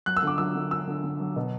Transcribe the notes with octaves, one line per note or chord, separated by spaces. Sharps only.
F#3 F#6
E6
D3 D6
F#3 E6
D3
D3 E6
D3
D3
F#3
B2